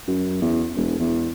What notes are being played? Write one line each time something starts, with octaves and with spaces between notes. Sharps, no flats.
F#2
E2
E1
E2